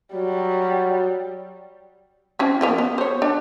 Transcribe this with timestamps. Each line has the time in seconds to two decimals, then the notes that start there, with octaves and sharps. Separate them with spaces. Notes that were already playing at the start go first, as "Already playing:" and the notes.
0.13 F#3 G3
2.39 C4 C#4 E4
2.61 F3 A#3 B3
2.78 B3
2.98 C5 C#5
3.22 D4